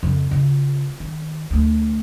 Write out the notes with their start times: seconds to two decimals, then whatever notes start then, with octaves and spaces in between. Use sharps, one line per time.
0.03 F2 C#3
0.31 C#3 F4
1.00 D#3
1.51 D2 A3